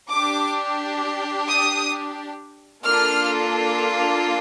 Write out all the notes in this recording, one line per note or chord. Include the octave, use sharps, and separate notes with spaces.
D4 G4 D6
D#6
A#3 D4 F4 A4 F6